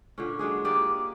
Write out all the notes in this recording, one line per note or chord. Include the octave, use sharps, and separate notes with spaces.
A#2 D3 C#4
F#3 G#3 D4 G#4
A#3 G4 D5 D#5